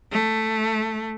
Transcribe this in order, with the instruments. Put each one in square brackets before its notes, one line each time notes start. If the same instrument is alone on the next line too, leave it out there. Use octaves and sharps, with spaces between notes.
[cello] A3